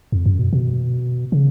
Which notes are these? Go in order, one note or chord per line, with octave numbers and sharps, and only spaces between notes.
F2
F#2
B2
B2
C#3